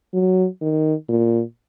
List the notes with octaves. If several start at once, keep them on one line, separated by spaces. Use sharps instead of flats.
F#3
D#3
A#2